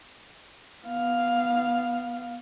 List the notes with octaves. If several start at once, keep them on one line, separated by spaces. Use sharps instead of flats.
B3 F5